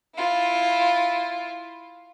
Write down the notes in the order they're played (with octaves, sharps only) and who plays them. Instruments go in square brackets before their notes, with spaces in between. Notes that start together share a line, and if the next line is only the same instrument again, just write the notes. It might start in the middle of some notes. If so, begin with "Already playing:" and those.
[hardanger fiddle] E4 F4